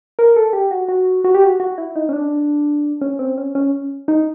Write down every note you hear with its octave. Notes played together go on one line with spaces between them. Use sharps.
A#4
A4
G4
F#4
F#4
F#4
G4
F#4
F#4
E4
D#4
C#4
D4
C#4
C4
C#4
C#4
D#4